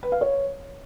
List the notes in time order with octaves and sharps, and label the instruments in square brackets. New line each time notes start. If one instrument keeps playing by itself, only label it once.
[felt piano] B4
F5
C#5